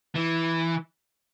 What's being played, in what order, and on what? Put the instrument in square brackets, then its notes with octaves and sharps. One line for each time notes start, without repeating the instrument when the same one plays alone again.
[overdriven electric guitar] E3